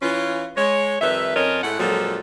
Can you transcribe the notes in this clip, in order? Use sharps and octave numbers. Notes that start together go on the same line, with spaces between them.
E3 C#4 F4
G#3 C#5
F2 D#3 G3 B4 E5
F2 C#4 F4 A#4 C#5 D#5
A2 G#3 A3 F#5
A#2 D3 F3 F#3 G#3 A4